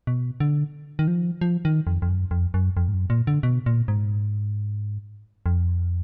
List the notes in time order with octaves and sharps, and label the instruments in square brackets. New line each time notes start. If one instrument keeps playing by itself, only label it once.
[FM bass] B2
D3
D#3
F3
F3
D#3
F2
F2
F#2
F2
F#2
F2
G#2
F#2
A#2
D3
B2
A#2
G#2
F2